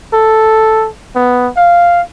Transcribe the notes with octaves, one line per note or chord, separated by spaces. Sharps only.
A4
B3
F5